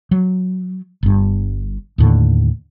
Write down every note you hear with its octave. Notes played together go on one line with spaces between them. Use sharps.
F#3
G1 G2
D#2 A2 D3